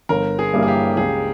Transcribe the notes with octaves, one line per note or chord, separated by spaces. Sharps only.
G1 A#4
G#4
G2 G3 A#3 E4
G#4
G4
C#2 G#4